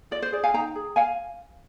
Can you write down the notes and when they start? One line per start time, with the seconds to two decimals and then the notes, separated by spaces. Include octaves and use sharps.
0.11 F4 D5
0.22 C5
0.32 G#4 D5
0.44 F5 G#5
0.54 D#4 G5 A#5
0.75 G#4
0.96 F5 G#5